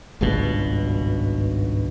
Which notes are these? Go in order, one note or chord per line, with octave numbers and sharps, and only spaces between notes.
G#1 C#2 G2 B2